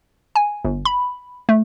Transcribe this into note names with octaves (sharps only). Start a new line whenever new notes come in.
G#5
G1
B5
A3